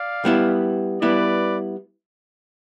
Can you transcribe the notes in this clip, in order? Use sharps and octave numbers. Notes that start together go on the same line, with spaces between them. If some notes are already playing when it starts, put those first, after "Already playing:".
Already playing: D5 F5
G3 B3 E4
G3 B3 E4 B4 D5